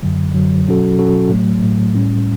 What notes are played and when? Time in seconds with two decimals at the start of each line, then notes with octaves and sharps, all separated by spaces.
0.03 F#2 D3 F#3
0.34 F#2 D3 F#3
0.67 B2 F#3 C#4 F#4 A4
0.98 B2 F#3 C#4 F#4 A4
1.30 A2 F#3 A3
1.62 A2 F#3 A3
1.94 A2 G3 C#4